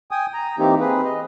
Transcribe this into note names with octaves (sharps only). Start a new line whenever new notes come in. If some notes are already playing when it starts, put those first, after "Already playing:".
G5 G#5 D#6
A#5
E3 A#3 C4 D#4 G4
C4 G#4 B4
D#5